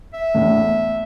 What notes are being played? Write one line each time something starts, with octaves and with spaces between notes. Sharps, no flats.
E5
E2 A2